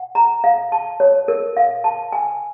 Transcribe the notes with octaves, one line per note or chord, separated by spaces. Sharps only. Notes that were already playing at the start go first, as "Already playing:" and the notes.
Already playing: F#5
A#5
F5
A5
C#5
A#4
F5
A5
G#5